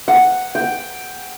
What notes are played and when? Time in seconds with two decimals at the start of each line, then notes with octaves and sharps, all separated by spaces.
0.08 F#5
0.55 G5